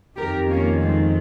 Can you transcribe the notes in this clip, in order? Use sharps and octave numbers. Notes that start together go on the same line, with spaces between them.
F2 D#3 G4 A#4
A#3 C#4
G#3 C4